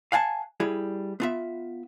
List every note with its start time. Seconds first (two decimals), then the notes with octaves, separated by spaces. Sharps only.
0.12 F5 F#5 G#5 A5
0.60 G3 E4 G#4
1.20 B3 F4 E5